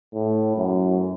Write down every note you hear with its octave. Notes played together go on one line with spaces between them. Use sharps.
A2
F#2